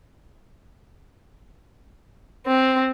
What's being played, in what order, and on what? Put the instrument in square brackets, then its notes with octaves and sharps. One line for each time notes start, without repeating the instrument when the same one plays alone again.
[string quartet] C4